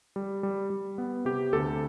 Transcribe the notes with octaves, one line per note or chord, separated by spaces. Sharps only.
G3
G3
G3
B3
C3 G4
D2 A4